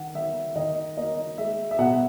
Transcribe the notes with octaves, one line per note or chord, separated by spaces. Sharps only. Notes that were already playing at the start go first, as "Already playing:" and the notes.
Already playing: D#3 F#5
D#3 E5
D#3 D#5
A#3 D#5
G#3 E5
E5
B2 F#5